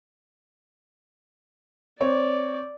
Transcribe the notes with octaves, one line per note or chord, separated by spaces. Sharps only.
C4 C#5 D5